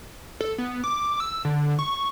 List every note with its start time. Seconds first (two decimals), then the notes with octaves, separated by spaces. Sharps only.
0.41 A4
0.58 B3
0.84 D6
1.20 E6
1.45 D3
1.79 C#6